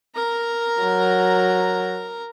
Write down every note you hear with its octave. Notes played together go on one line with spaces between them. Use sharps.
A#4 A#5
F#3